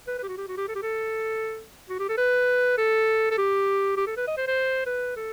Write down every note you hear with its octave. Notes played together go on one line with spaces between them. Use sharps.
B4
B4
G4
F#4
G4
F#4
G4
A4
G4
A4
F#4
G4
A4
B4
A4
A4
G4
G4
A4
B4
D#5
C5
C5
B4
A4